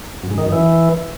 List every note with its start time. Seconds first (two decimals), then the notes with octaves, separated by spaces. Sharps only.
0.23 F#2
0.31 G#2
0.38 D#3
0.45 F#2
0.52 E3